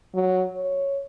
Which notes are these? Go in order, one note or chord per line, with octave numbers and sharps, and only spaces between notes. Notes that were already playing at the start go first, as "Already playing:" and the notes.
F#3
C#5